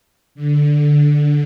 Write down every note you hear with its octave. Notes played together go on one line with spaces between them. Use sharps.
D3